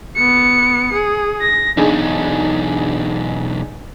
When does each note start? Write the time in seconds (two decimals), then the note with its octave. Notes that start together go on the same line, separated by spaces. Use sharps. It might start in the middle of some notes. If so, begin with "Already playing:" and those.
0.16 B3 C#7
0.93 G#4
1.42 A#6
1.77 B1 E2 D4 D#4 G#4